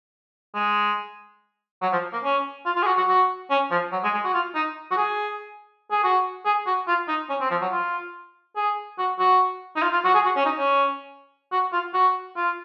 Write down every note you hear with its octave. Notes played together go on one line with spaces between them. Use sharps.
G#3
F#3
F3
A#3
C#4
F4
F4
G#4
F#4
F#4
F#4
C#4
F3
F#3
G#3
G#3
F#4
F4
D#4
F#4
G#4
G#4
F#4
G#4
F#4
F4
D#4
C#4
C4
F3
F#3
F4
G#4
F#4
F#4
D#4
F4
F4
F#4
G#4
F#4
C#4
D#4
C#4
F#4
F4
F#4
F4